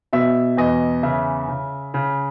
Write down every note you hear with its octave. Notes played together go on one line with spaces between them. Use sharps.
B2 E5
E2 D#5
C#3 E5
C#3
C#3